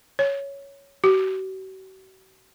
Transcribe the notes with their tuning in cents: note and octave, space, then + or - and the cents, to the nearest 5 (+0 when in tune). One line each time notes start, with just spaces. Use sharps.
C#5 +5
F#4 +45